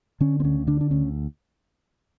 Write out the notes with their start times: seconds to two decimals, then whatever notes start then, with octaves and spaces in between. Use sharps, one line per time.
0.21 D3 C#4
0.40 C4
0.44 D2 C#4
0.67 D3 D4
0.81 D4
0.91 D2 C#4